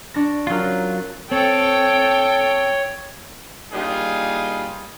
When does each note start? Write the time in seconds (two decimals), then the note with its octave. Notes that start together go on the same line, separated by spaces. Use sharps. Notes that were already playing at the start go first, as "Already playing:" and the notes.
0.14 D4 C#6 A#6
0.47 F#3 C#4 F4 A#4
1.31 C4 A4 C#5 G5
3.73 G3 A#3 D4 D#4 F4 G#4